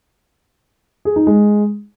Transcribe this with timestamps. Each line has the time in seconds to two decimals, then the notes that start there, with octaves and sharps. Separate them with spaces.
1.05 G#4
1.16 D#4
1.27 G#3